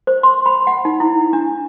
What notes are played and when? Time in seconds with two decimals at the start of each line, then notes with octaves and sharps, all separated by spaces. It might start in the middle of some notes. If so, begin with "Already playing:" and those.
0.07 C5
0.23 C6
0.46 B5
0.67 F#5
0.85 D#4
1.00 E4
1.33 D4